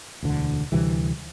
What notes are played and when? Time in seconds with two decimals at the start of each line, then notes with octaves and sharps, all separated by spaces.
0.22 E1 D2 D3
0.72 D2 C3 E3 G3